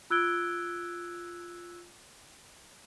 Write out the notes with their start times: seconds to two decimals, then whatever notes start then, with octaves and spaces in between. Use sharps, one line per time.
0.10 F4 E6 F#6 G#6 D7 G7